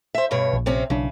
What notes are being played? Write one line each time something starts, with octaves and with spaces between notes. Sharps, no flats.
C5 E5
G2 B2 C#5
A#1
C3 C4 C#4
B1 C#3 D4